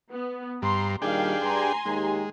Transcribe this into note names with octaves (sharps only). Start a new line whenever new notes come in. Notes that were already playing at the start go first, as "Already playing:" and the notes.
B3
G2 A#5 C6
A#2 D#3 G3 D4 G4 G#4 F5 G5
G2 G#5 A#5 C6
D#2 G#3 D#4 G4